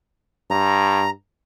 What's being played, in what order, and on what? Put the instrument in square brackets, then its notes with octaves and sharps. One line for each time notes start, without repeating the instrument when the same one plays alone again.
[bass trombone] G2 [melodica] A#5